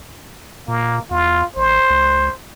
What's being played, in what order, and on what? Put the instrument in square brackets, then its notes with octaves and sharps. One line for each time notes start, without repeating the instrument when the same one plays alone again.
[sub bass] A#2 [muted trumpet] A#3
[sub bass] E2 [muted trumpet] F4
[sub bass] A1 [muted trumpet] C5
[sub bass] C#2